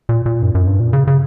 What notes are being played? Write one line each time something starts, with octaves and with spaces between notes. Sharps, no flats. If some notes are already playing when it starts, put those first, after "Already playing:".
A#2
A#2
F#2
F#2
G2
A#2
C#3
C#3